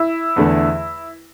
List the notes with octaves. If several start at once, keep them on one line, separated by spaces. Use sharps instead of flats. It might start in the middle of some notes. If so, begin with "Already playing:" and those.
Already playing: E4
E2 D3 A3